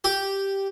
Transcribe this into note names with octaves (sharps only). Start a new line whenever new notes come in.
G4